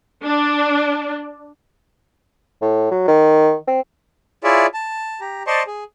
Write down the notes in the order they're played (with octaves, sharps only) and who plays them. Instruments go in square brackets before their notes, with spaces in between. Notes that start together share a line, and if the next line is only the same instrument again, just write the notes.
[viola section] D4
[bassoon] A2
F#3
D#3
C4
[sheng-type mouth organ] E4 F4 G#4 C#5 D5 E5
A5
G4 A#5
C5 D5 D#5 A5 C6 C#6
G#4